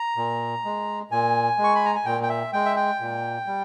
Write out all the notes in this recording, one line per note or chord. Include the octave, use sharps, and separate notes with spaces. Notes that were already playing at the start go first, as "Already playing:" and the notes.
Already playing: A#5
A#2
G#3
A#2 G#5
G#3
C#6
B5
A#5
G#5
A#2 G5
G5
E5
G#3 G5
E5
G5
A#2
G3